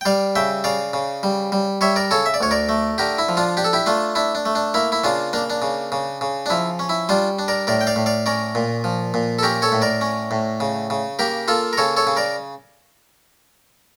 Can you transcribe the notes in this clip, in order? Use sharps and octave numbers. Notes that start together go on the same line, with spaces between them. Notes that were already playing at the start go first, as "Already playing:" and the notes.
G5
G3 D5 F5
C#3 E5 G5
C#3 D5 F5
C#3
G3
G3
G3 C#5 E5
A#4 D5
C#3 A4 C#5
E5
D5
D2 C#5
A#4 D5
A3
D3 G4 A#4
E4
F3
D4 F4
D4 G4
A4
E4 G4
A3 D4 F4
D4 E4
D4
A3
D4
A#3 E4
E4
C#3 D4 F4
A#3 D4
D4
C#3
C#3
C#3
D4
F3 E4
C#4
E4
G3 D4 F4
D4
A#4 D5
A2 A#4 D5
G5
D5 F5
A2
D5 F5
C#4 A#4 D5
A#2
F3
A#2
A4
C#4 G4 A#4
A4 C#5
A2
A#4 D5
C#4
A2
C#3
C#3
A#3 G4 A#4
A#3 F4 A4
A#4
C#3 A4 C#5
A4 C#5
C#3
A#4 D5